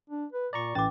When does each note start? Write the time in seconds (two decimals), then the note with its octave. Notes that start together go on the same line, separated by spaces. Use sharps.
0.10 D4
0.32 B4
0.53 A#2 D5 A#5 C#6
0.75 A1 E3 C#4 D6 A6